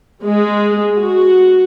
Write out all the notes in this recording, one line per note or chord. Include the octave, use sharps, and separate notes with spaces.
G#3
F#4